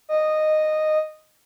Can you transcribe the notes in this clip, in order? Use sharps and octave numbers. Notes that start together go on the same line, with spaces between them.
D#5